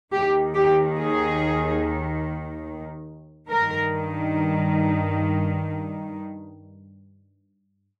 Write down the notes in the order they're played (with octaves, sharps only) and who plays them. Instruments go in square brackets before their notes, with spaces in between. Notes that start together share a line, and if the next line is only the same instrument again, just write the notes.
[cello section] D#2 D#3 G4
G4
G#4
G2 D#3 A#4